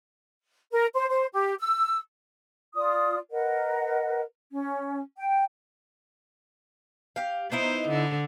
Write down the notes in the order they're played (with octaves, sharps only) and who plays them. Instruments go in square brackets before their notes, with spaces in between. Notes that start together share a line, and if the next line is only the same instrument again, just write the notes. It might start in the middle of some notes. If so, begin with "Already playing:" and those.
[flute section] A#4
C5
C5
G4
E6
F4 D5 D#6
A#4 B4 D#5 F#5
C#4
G5
[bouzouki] G4 F5
[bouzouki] B3 D#4 E4 [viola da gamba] C5
[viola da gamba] D3